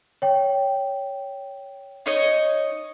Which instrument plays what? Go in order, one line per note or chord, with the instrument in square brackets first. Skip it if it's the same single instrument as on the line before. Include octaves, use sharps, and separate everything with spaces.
[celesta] C#5 G5
[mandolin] D#4 C#5 D#5